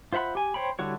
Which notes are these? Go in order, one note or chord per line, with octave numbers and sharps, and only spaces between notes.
F4 C5 E5 F#5 B5
G4 G#5
C5 C#5 G5 B5
D3 G3 E4 F#4 C#5